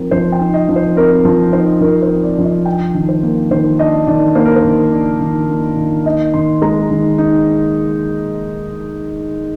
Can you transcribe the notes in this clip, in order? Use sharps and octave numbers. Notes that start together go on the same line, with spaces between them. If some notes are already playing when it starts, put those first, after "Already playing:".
Already playing: F3 C4 D#4 A#4
F3 C5
G5
D#4
D#5
F3
C5
C4 A#4
F3
D#4 C5
F3 A#4
C5
C4
D5
F3
D#5
D4 G5
D#3
C5
A#3
D#3 C5
D4 D#5
D#3 D5
A#3 C5
A#4
C5
D#3
D4
D#3
A#3
D#3
D#4 D#5
D#3 C6
G#3 A#5
D#3
D#4